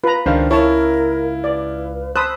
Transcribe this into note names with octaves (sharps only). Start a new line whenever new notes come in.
F4 B4 A#5
C#2 D#3 D4 C5 F5
E4 A#4 C#5 A5
B4 D5
C5 A5 B5 C6 D#6 E6 F#6